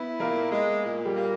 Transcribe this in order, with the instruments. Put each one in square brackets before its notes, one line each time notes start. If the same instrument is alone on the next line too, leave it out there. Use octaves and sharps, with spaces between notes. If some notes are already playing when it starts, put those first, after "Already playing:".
Already playing: [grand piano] B3 B4 [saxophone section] E4
[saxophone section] A#2 [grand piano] A#3 A#4
[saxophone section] G#3
A#2
[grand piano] G3 G4
[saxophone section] A#3